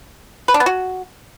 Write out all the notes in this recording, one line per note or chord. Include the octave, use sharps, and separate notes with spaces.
B4
D4
B3
F#4